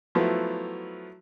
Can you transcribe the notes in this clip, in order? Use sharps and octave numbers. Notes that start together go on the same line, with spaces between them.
F3 F#3 A3 B3 E4